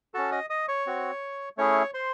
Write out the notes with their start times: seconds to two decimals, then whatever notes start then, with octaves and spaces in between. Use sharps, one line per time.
0.14 C#4 F#4 A4 A5
0.32 D#5 D#6
0.50 D#5 D#6
0.68 C#5 C#6
0.86 C4 F#4
1.58 A3 C#4 E4 G#4 C#5 C#6
1.94 C5 C6